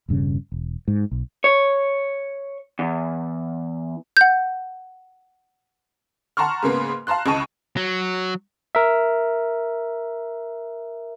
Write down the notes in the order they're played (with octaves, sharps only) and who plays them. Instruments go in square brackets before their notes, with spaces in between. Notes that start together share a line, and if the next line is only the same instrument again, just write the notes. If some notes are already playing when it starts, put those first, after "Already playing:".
[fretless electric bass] E1 G2 C#3 C#4
E1
G#2
B1
[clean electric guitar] C#5
E2
[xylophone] F#5 G6
[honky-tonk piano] F#5 A5 A#5 C6 C#6 F6
G#2 C#3 A#3 B3
F5 A5 A#5 C6 F#6
C#2 C#3 D#5 A5 C#6 D#7
[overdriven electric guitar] F#3
[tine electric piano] A#4 E5